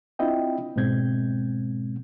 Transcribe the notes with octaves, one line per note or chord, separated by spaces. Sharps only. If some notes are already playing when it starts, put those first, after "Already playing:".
C4 D4 E4 F4 D#5 G5
G#2 B2 G#3 C4 G6 G#6